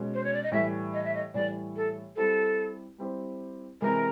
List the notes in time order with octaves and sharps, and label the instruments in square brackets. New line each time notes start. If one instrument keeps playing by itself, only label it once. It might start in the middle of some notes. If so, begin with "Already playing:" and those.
Already playing: [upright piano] B2 G#3 C#4
[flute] C5
C#5
D5
D#5
[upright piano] A2 E3 G3 [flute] E5
[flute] D#5
E5
D#5
[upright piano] A2 E3 G3 [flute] D5
[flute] A4
[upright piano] G3 C4 E4 G4 C5 [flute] A4
[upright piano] G3 C4 E4 G4 C5
[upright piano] C3 E3 G#3 [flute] A#4